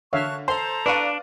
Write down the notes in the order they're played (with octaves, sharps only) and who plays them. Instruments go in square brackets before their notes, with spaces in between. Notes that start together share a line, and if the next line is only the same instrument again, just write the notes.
[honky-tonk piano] D3 [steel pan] C#5 E5 F5 [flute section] A5 C#6 F#6
[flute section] A4 A5 A#5 [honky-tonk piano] C5 [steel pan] C6
[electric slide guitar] D4 [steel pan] B4 C#6 [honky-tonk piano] D5 F5 D#7